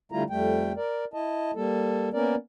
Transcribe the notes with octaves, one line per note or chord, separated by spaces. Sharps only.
D3 G3 A3 E4 F4 A#5
F2 G3 A3 G5
A#4 D5
E4 D#5 A5
G3 A#3 A4
A#3 B3 C#4 A#4 D5